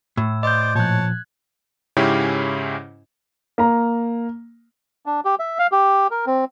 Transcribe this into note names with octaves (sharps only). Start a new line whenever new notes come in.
A2 E6
C5 D5 D#5 D6 G6
A#2 F3 C#5 A5 F#6 G#6
G#2 C#3 C#4 E4 G4
A#3 A#5
D4
G4
E5
F5
G4
A#4
C4